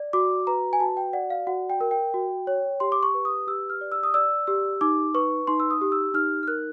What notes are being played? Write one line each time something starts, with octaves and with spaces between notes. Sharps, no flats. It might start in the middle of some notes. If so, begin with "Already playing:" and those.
Already playing: D5
F#4 D6
B4 A#5
G#5
F#4 A5
G5
D5 F#5
F5
F#4 F#5
G5
A#4
G5
F#4
C#5
G4 C6
D6
C#6
B4
D#6
G4 E6
F6
D5
E6
D#6
D5 E6
G4 E6
D#4 D6
B4 C#6
D#4 C6
E6
D#6
G4
E6
D#4 F6
F6
A#4 F#6